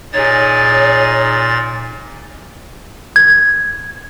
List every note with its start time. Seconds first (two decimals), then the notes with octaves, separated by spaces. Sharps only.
0.13 A#2 D#4 G#4 C#5 A6
3.16 G#6